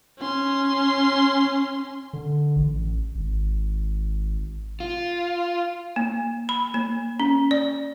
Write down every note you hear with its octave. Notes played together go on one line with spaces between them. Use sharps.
C#4 C6
D3
A1
G#1
F4
A#3
B5
A#3
C#4
D5